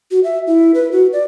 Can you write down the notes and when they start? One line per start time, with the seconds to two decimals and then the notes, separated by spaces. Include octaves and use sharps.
0.11 F#4
0.24 E5
0.47 E4
0.74 B4
0.92 F#4
1.13 D5